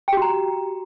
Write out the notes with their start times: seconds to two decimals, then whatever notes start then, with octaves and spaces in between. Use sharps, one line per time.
0.08 G5
0.13 G4
0.17 F#4
0.22 A#5